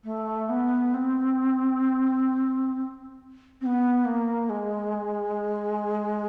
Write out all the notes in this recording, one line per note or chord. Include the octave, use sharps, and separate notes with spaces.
A3
B3
C4
C4
B3
A#3
G#3